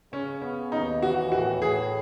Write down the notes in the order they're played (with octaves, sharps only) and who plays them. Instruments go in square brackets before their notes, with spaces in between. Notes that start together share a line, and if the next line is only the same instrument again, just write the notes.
[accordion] C#3 [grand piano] C#4
[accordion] B3 [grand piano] C#4
[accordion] D#2 [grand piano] D#4
[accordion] E3 [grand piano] F#4
[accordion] A2 [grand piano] F#4
[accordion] A2 [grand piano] G#4